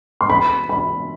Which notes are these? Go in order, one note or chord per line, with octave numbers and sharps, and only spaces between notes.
C6
B5
B5